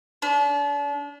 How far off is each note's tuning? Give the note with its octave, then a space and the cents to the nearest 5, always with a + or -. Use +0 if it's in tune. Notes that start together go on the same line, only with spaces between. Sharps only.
D4 -40